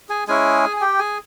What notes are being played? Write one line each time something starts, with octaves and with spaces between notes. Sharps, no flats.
G#4 G#5
G#3 C#4 E4 G#4 G#5
G#5
G4 G5
G#4 G#5